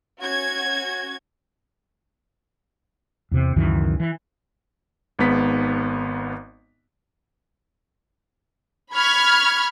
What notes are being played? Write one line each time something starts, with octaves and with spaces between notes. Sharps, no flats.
C#4 F#4 G#6
E2 C3
C#2 F#2 D#3 E3
E3
G#1 G#2 B3 B6
B5 C#6 F6 G#6